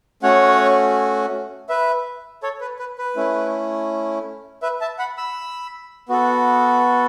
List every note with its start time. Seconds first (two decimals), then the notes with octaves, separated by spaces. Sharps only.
0.23 A3 C#4 F#4 C#5 F#5
1.69 B4 E5
2.43 A4 C#5
2.61 B4
2.79 B4
2.98 B4
3.16 A3 C#4 E4
4.62 B4 E5
4.81 E5 A5
4.98 F#5 B5
5.17 B5 E6
6.09 B3 F#4 A4